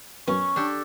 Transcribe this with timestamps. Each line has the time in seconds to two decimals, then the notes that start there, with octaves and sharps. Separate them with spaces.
0.28 F#2 B3 C#4 C#6
0.56 D4 G4 A4